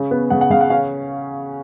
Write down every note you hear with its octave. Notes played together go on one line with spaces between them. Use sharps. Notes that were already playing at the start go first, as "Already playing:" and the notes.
Already playing: C#3 C#4
B3
C#3 F#5
F#5
C#3 F5
F#5
C#4 F5